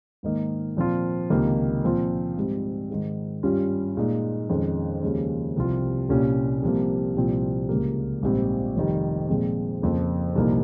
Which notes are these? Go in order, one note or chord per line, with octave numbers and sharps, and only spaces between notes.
G#2 D#3 A#3 D#4
A#2 F3 C4 F4
C#2 C3 D#3 A#3
A#2 F3 C4 F4
G#2 G3 C4
G#2 D#3 G#3
G2 G3 C#4 F4
A#2 G#3 D#4
F2 D#3 G#3 C#4
D#2 C#3 F3 G#3 C#4
C2 C3 F3 C4 F4
C2 A#2 G3 C#4
C2 C3 F3 A#3
C2 A#2 F3 C4 F4
C#2 C#3 G3 A#3
A#1 G#2 G3 C4
F1 F2 D#3 G3
A#2 F3 G#3 C4
F2 C#3 F3 A#3
C2 A#2 F3 A#3 D#4